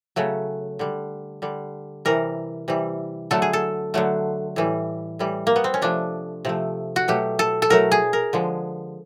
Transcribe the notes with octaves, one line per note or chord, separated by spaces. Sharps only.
C#3 F#3 A3
D3 G3
D3 G3
C3 E3 G3 A#4
C3 E3 G3
D3 F#3 A3 A4
G#4
A4
D3 F#3 A3
A2 E3 G3
A2 E3 G3
A#3
B3
C4
C#4
C3 F3 A3 D4
C3 F3 A3
F#4
B2 F#3 A3 G4
A4
A4
B2 F#3 A3 A#4
G#4
A#4
D3 F3 G#3